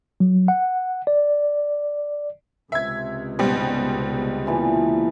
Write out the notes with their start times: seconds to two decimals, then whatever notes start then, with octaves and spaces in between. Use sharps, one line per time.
0.20 F#3
0.48 F#5
1.07 D5
2.72 C#2 C3 E5 G#6
3.39 G#2 B2 G3 C5
4.46 A#2 E3 A5